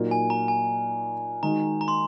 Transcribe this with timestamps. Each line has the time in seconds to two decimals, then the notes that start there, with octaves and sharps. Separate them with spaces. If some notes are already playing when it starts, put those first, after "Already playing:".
Already playing: A#2 F#3 A#3 D#4
0.11 G#5
0.30 A#5
0.48 G#5
1.43 D#3 G#3 D#4 F#4 A#5
1.81 A#5
1.88 C6